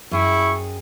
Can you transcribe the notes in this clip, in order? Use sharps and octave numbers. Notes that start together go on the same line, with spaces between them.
F#2 E4 G#4 G5 C#6